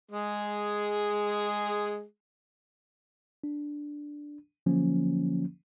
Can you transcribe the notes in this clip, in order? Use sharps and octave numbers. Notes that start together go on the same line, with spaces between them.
G#3 G#4
D4
D3 F3 F#3 A#3 C#4